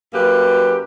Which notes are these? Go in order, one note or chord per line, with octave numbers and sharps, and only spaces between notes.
F#2 A#3 G4 B4